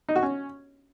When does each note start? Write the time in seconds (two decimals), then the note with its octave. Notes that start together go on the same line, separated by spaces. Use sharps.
0.09 D#4
0.16 F#4
0.23 C#4